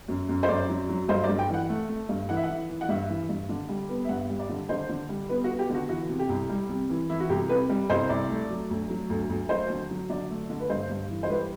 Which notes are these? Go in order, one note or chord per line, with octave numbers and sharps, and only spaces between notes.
F#2
F#2
C5
F#2 D5
F#3
F#3
G2 C5
D5
G2
G5
E3 F#5
A3
A3
G2
E3 F#5
E5
F#5
E3
E3
F#5
G2 E5
E3
G2
D3
G3
B3
E5
G2 F#5
G3
D5
D3
D3 C5
D3
G3
B3 B4
F#4
B3
G4
D3 F#4
E3 F#4
C3
G4
C2
G3
C3
E3
E3 E4
F#4
C2 G4
C3 B4
G3
C2 C5
C2 D5
A3
F#3
D2
F#3
D2
D2
F#3 C5
D3
F#3
D3 D5
A3
D3
B4
G2 C5
G2
E3
C5
G3 B4